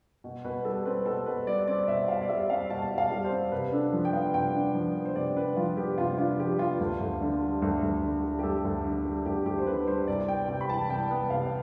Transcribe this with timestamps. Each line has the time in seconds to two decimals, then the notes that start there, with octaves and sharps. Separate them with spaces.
0.24 B2
0.44 B2 B4
0.65 G3 A4
0.85 C4 B4
1.06 B2 A4
1.26 B2 B4
1.46 G3 D5
1.67 C4 D5
1.88 B2 E5
2.08 B2 F5
2.22 D5
2.29 G3 E5
2.50 C4 F5
2.70 B2 A5
2.91 B2
2.98 F5
3.10 G3
3.24 C5
3.31 C4
3.52 C3 B4
3.72 D4 A4
3.93 F3
4.05 G5
4.13 B3 F5
4.34 C3 G5
4.55 D4
4.75 F3
4.95 B3
5.05 C5
5.16 C3 D5
5.36 D4 B4
5.56 F3 F4
5.77 B3 G4
5.98 C3 F4
6.18 D4 F4
6.39 F3 G4
6.59 B3 F4
6.80 D2
7.01 D2
7.21 D3
7.41 G3
7.62 D2
7.83 D2
8.03 D3
8.23 G3
8.39 G4
8.43 D2 A4
8.65 D2
8.85 D3
9.05 G3
9.26 D2 G4
9.46 D2 G4
9.58 C5
9.67 D3 B4
9.87 G3 C5
10.08 C2 D5
10.28 B3 G5
10.49 C3 G5
10.61 B5
10.69 E3 A5
10.89 C2 G5
11.11 B3
11.30 C3 F5